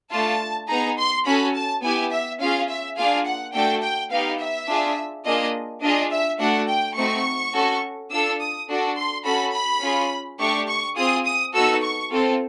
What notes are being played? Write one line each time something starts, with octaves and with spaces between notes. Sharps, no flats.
A3 D4 F4 A5
B3 D#4 G#4 A#5
C6
C#4 F#4 A4 B5
A5
B3 E4 G4 G#5
E5
C#4 F4 G#4 F5
E5
A#3 D4 F4 G#4 F5
F#5
A3 D4 F#4 A4 G5
G5
B3 D#4 G4 F5
E5
D4 F4 G#4
A#3 D4 F4 G#4 D#5
D4 F4 G#4 D#5
E5
A3 D4 F#4 F#5
G5
A3 C4 D#4 F#4 C#6
C#4 F#4 A4
D4 F4 A4 E6
D#6
D4 F#4 A4
C6
C#4 F#4 A4 B5
B5
C#4 F4 G#4
A3 D4 G4 C#6
C#6
C4 F4 G#4 D#6
D#6
B3 D#4 F#4 A4 E6
C#6
C4 F4 A4